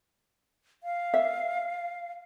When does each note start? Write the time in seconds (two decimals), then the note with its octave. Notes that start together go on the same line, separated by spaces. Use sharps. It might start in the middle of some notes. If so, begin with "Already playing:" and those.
0.83 F5
1.14 E5